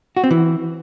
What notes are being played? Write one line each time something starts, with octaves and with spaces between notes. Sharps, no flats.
F#4
C4
E3